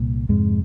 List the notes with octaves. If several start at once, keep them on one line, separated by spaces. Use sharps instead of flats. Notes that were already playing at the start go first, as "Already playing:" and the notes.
Already playing: C2 A#2
F2 G#2 C3 G#3